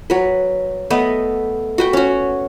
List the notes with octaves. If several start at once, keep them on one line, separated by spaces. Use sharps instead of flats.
F#3 B4
A3 B3 B4 D#5
F#4 B4 G5
C#4 F#4